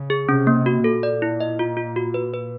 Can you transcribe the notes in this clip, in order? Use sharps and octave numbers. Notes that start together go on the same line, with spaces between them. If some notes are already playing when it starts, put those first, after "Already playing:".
Already playing: C#3
G#4
C3 C#4
A#3
F#4
A#2 A4
D5
E4
D#5
F4
F4
F#4
B4
B4